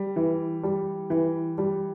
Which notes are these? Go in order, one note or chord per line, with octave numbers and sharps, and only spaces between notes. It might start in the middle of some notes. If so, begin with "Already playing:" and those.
Already playing: G3
E3
G3
E3
G3